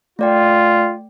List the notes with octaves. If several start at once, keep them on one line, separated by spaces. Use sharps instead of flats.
A3 F4 D5 G5